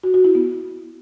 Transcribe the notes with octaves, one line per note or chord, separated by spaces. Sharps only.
F#4
F#4
E4
B3